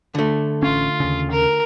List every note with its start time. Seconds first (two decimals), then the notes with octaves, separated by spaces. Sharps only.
0.15 D3 A3
0.63 A1 C#4 F4
1.00 D#2 C#3
1.31 A#4